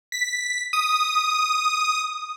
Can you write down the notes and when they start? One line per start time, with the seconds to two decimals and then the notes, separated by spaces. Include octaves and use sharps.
0.12 B6
0.73 D#6